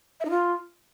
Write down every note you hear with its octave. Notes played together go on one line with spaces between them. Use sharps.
E5
D#4
F4